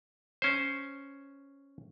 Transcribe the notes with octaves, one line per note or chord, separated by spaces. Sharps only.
C#4 C5